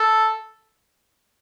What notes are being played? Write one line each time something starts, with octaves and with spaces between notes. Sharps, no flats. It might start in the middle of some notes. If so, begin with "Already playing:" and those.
Already playing: A4